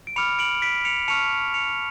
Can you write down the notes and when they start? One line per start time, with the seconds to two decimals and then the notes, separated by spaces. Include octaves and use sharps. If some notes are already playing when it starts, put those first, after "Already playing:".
0.07 D7
0.16 B5 D6 F6 C#7 F7
0.39 D7 F#7
0.62 B6 D7
0.85 C#7 F7
1.08 A5 C#6 F6 C#7 F7
1.54 C#7 F7